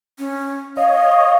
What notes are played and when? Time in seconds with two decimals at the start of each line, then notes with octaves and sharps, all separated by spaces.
0.18 C#4
0.77 C#5 D#5 F5